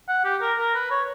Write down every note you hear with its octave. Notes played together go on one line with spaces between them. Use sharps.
F#5
G4
A#4
A#4
B4
C#5